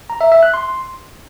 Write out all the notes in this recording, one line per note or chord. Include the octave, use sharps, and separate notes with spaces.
A#5
E5
E5
F#6
C6